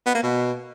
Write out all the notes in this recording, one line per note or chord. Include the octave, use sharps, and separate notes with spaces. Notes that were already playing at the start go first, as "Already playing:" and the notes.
B3
A#3
B2